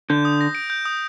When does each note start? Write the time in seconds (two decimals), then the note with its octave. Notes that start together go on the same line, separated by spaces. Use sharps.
0.10 D3 G6
0.25 D#6
0.41 A#6
0.55 D7
0.70 G6
0.85 D#6